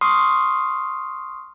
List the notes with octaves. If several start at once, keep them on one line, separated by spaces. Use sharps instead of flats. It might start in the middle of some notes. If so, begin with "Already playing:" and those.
C6 C#6 D#6 F6 C7